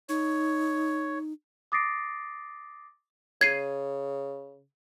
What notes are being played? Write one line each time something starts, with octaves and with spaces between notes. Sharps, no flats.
D#4 C#5
D6 D#6 A6 A#6 C7 D7
C#3 G#6 C7 D#7